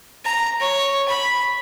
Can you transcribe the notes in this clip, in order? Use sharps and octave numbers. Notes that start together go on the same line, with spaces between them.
A#5
C#5
B5